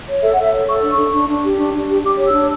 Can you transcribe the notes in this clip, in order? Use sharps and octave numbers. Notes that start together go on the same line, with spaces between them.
C#5
A4 E5
A4 F#5
E5
C#5
A4 C#6
D4
C#6
D4
D4
D4
G4
D4
D4
G4
G4 D6
C#5
E6
D4